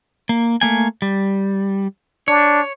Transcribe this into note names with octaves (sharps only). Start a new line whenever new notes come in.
A#3
A3 A#3 G#5
G3
D4 C#5